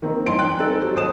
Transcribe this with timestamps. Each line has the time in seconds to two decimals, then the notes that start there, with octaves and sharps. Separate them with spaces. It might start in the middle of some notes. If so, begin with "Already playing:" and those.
0.02 D#3 A#3 C4 D#4
0.26 G1 E2 D#4 C6 D7
0.38 G5 F#6
0.58 C4 D#4 A4
0.82 F#3 G4
0.95 D#2 C5 D#6 E7